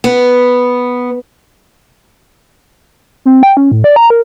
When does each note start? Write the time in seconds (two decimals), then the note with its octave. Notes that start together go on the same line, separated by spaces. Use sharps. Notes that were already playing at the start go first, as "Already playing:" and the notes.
0.04 B3
3.25 C4
3.43 G5
3.57 C#4
3.72 A2
3.84 D5
3.96 A#5
4.10 A#4